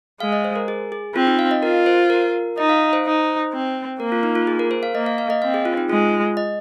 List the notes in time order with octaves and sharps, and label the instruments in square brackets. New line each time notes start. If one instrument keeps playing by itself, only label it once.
[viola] G#3 [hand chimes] F5
[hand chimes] D#5
C5
A#4
G#4
G#4
[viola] C4 [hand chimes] F4
[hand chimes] D#4
F5
D#5
[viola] F4 [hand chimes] A#4
[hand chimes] C5
A#4
[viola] D#4 [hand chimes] D#5
[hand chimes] F5
C5
[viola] D#4
C4
[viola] A#3 [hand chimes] A#4
[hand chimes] F4
D#4
F4
G#4
A#4
C5
F5
[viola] A#3 [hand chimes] D#5
[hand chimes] F5
F5
D#5
[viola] C4 [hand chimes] F5
[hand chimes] G#4
F4
D#4
[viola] G#3 [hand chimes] F4
[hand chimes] D#5